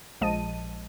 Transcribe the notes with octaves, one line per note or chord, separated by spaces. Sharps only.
A#1 F3 G#3 D#5 A5 D#7